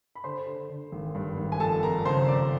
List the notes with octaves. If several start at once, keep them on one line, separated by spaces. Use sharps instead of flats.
B5
D3 C5 C6
D3
D3
G#1
G2
G#1
G#5
F2 A4 A5
F2 A#4 A#5
C#3 C5 C6
F2 D5 D6